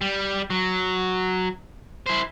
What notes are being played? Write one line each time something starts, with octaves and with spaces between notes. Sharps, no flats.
G3
F#3
E4 C5